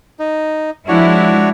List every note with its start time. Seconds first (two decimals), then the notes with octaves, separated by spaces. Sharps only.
0.19 D#4
0.88 F3 G#3 D4 E4 F#4 C#5